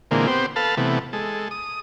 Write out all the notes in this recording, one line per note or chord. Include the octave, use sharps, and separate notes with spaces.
A#2 D3 E3 G#3 A#3 C4
B3 C4 G4 C5
A4 B4 F5 A5
C3 E3 A3 B3
G#3 A4
D#6